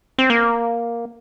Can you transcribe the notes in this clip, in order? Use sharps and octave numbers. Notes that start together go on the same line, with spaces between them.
C4
A#3